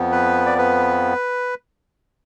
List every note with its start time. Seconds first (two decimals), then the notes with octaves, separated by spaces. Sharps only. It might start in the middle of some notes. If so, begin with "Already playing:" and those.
Already playing: F2 F3 B3
0.12 B4
0.46 D5
0.58 B4